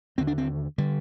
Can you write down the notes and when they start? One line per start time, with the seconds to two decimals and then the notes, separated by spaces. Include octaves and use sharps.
0.18 D#2 D3 C4
0.27 D4
0.38 C4
0.78 D3 G3